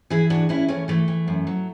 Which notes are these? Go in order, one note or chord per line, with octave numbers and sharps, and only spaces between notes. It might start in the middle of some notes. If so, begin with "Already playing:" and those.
E3 E4 G#4
A2 D4 F#4
E3 C#4 E4
E3 A3 C#4
E3 A3
E3
F#2
F#3